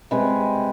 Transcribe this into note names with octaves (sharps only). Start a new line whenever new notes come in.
C3 G#3 B4